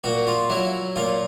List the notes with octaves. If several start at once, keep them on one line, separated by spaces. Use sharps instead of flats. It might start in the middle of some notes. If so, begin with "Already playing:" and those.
A#2 F#4
F4
F#3 E4
A#2 F4